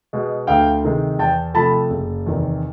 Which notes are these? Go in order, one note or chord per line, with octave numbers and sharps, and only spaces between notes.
B2 G#3
D2 F5 G5
C3 D#3 G#3
E2 G5 A5
C3 F3 A3 A5 B5
F#1
E2 C3 D#3